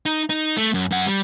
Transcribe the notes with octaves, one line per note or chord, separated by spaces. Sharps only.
D#4
D#4
A3
F#2
F#2 F#5
G3